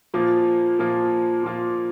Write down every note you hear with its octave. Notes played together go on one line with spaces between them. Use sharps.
A#2 F3 A#3 F4
A#2 F3 A#3 F4
A#2 F3 A#3 F4